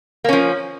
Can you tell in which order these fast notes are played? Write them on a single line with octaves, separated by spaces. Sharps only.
A#3 C#4 F3